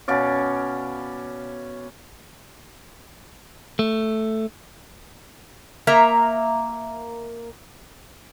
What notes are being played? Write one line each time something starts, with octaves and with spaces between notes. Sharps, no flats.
B2 C#4 D5 F5
A3
A#3 A#4 E5 A#5